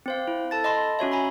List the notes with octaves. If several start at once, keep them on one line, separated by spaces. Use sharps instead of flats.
C4 C5 F5
E4
A4 A5 A6
D#5 A5 B5 C6
C#4 F#4 C#5 E5
C#5 G#5 A#5 B5